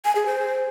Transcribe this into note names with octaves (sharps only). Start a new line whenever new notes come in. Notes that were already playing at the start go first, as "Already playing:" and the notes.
G#5
G#4
C5